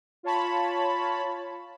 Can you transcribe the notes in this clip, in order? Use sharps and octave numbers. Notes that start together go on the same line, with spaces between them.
F4 C#5 A5 B5